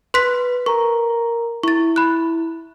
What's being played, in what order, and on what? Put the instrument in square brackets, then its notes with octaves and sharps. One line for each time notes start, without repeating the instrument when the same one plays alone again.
[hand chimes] B4 [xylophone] C6 F#6 B6
[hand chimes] A#4 A#5 [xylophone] C#6
[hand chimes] E4 [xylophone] C#6 A6
[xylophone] B5 F#6